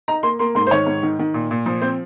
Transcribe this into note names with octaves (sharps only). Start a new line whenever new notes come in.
D#4 A#5
A#3 C6
A#3 C6
G#2 C6
C5
D#3 C#5
G#2
D#3
D#3
A#2
A#2
F3
C4 C5